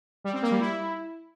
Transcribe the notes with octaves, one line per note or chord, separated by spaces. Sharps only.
G3
C4
A#3
G3
E4